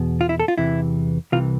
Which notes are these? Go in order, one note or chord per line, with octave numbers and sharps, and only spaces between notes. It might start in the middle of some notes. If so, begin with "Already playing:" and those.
Already playing: E2 B2
F4
E4
A4
F4
E2 C3 E3 E4
C2 C3 E3 F4